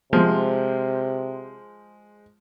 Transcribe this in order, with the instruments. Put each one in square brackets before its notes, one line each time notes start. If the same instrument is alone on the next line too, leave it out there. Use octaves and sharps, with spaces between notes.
[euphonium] C3 [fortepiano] F3 [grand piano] G#3 C5